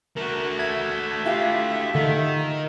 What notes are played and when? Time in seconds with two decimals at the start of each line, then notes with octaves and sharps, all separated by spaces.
0.16 A3 F#4 A#4
0.59 E5 G#6
1.25 E4 F4 G4
1.95 D3 D#3